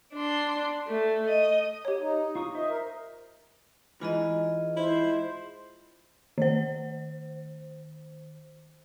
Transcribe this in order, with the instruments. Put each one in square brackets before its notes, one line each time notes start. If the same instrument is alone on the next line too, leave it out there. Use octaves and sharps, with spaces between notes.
[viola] D4 C6
A3
D#5
[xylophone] G4 C#5
[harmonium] D#4
[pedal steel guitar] F4 C#6 D#6
[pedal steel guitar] C5 E5 [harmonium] D#5
[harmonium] A#4
[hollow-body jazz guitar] G#2 E3 [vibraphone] F4 G#4 D#5
[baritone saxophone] E4 [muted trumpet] C5
[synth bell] D#3 C5